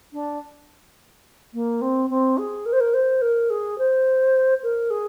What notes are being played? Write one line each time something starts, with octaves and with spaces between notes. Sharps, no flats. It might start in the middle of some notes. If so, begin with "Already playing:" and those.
D4
A#3
C4
C4
G#4
A#4
C5
A#4
C5
A#4
G#4
C5
A#4
G#4